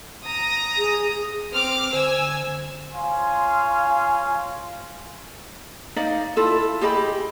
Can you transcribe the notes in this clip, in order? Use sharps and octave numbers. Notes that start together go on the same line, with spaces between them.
A#5 D#6
G#4
C4 D6 F6
D3 C5 G#5 E6
F4 C#5 F5 G#5 C6
D#4 D5 D#5 F5
E4 F4 A4
G4 G#4 D#5 B5